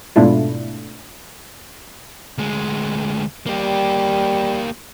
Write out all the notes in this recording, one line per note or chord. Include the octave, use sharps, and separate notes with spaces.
G#2 B2 A3 D4 E4 F4
D2 G#3
G3 A#3 G4